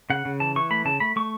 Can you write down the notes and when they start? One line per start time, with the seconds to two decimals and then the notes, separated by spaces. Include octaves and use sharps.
0.10 C#3 F#5
0.25 C#3
0.40 E3 A5
0.56 E3 C#6
0.70 A3 B5
0.85 C#3 A5
1.00 A3 B5
1.16 A3 C#6